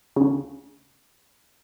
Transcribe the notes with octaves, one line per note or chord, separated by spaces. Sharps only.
D2 C#3